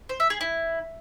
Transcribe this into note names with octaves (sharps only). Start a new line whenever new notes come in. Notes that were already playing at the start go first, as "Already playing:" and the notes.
C5
E5
G#4
E4